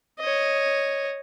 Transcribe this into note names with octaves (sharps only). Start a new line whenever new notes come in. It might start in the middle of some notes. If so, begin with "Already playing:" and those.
C#5 D#5